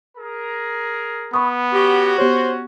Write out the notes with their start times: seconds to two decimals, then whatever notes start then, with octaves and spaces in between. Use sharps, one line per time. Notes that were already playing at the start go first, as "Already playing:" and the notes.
0.17 G#4 A#4
1.34 B3 B5 C#6 D#6
1.74 C#4 F#4 G4
2.18 B3 G4 C5 C#5